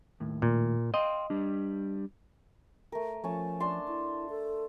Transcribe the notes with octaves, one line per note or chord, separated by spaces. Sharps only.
D#2 A2
A#2
D#5 F5 G5 C6
G3 D4
A3 A#4
F3 A3 C#4 A5
D4 A5 C6
E4
A4